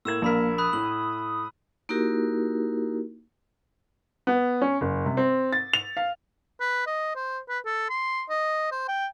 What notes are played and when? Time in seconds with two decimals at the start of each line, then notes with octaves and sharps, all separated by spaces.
0.05 A2 A#3 E6 G#6 E7 F#7
0.22 A#1 A#3 A#4 A5 B5 B6
0.58 B5 D#6 F#6
0.73 A2 F#7
1.89 A#3 D#4 E4 F#4 G4 A#4
4.27 B3
4.62 C#4
4.81 F#1
5.06 C3
5.17 C4
5.53 A6
5.73 F7
5.97 F5
6.60 B4
6.86 D#5
7.16 C5
7.49 B4
7.65 A4
7.89 C6
8.29 D#5
8.71 C5
8.88 G5